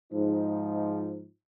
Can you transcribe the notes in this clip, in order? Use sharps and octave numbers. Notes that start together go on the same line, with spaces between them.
G#2 F3 D#4